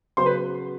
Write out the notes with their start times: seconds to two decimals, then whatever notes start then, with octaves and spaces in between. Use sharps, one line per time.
0.17 C#3 F#3 B3 C5 C6
0.26 B4